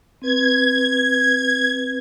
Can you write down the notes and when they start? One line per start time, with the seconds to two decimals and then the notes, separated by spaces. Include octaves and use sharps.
0.22 C4 B4 G#6